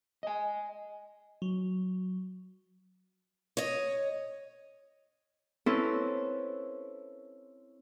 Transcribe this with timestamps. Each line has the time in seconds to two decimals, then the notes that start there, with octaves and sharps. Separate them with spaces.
0.23 D#5 G#5
1.42 F#3
3.57 C#5 D#5
5.66 C4 C#4 E4 A4 B4 C5